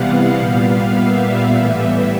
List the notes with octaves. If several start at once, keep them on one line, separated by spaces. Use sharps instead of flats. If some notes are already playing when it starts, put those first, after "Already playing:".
Already playing: C3 E3 G3 B3 F5 F#5
A#2 G3 B3
E5
A2 E3 G3 B3